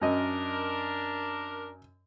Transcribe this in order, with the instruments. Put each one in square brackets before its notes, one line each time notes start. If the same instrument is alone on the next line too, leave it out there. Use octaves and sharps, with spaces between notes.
[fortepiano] F#2 D#5 [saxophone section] D4 A#4